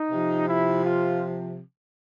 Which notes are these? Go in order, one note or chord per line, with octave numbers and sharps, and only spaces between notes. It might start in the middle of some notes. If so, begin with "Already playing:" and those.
Already playing: D#4
C3 F3
E4
F4